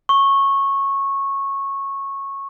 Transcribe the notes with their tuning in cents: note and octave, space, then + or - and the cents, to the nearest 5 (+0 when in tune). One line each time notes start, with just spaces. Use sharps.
C#6 -15